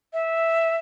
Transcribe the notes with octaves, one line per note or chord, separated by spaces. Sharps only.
E5